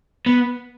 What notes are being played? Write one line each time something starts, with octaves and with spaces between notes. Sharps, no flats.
B3